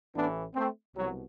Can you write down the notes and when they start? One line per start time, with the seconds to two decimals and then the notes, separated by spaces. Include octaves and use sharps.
0.15 A1 A2 E3 B3 D4
0.55 A3 C4
0.96 C2 B2 F#3